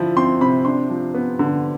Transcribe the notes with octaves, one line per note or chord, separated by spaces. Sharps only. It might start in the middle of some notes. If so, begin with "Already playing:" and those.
Already playing: D3 F3 E4
C4 C6
C3 B5
D4 C6
F3
B3
D3